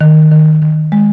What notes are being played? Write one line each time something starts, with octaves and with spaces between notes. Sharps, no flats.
D#3
D#3
D#3
G#3